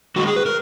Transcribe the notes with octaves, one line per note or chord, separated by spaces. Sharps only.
D#3 G#3 F#4
G#4
B4
A#4